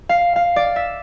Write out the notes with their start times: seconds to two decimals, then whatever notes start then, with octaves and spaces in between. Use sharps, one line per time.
0.09 F5
0.36 F5
0.56 D5
0.76 E5